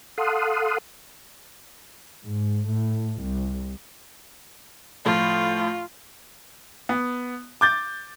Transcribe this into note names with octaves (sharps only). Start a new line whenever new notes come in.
A4 F5 F#5 C6 D#6
G#2
A2
C2
A2 F3 F4
B3
D6 G6 A6